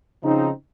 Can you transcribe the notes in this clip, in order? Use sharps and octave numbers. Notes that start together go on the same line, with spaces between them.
C#3 F3 C4 D#4